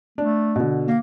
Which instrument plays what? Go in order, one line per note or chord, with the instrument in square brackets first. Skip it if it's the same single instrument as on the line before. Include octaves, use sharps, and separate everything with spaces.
[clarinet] A3 [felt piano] D4
[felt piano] B2 D3
[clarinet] A#3